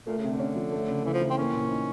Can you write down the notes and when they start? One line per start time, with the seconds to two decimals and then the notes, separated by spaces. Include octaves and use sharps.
0.06 A#2 A3
0.18 C#3
0.23 C3
0.29 D3
0.39 C#4
0.56 F3
0.72 A3
0.88 C#3
1.05 C#3 E3
1.13 F3
1.21 E3
1.30 C4
1.37 A#3 C#4
1.54 A#2
1.70 D#4